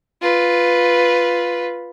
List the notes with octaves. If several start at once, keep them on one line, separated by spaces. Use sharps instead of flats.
F4 B4